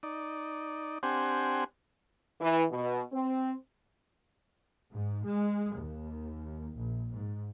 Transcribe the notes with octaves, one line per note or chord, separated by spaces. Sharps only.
D#4 D5
C4 D4 G4 C5 F#5 G#5
E3
B2
C4
G#2
G#3
D#2
A#1
G#2